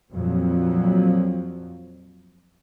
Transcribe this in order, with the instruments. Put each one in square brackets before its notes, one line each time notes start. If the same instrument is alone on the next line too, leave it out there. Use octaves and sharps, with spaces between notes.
[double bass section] F2 A#2 F3 F#3